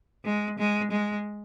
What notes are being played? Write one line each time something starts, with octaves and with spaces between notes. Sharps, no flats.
G#3
G#3
G#3